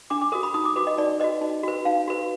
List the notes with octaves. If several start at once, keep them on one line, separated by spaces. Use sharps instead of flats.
D4 D6
D6
F#4 A#4 D#6
B5
D#4 D#6
D6
F#4 B4 D6
D#5
D#4 D5
F#4 B4 D#5
D#4
F#4 B4
D#4 F5
F#4 B4